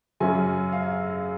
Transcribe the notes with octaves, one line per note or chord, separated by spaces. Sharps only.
F#2 C#3 F#3 C#4 G#5
F5